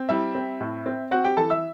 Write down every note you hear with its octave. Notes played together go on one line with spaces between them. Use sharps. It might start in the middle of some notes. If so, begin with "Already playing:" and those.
Already playing: C4
G3 E4 E5
C4
A2
C4
C4 F#4 F#5
G4 G5
E3 A4 A5
E5 E6